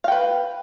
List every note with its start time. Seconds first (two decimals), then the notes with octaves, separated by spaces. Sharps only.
0.04 F5
0.08 G5
0.12 B4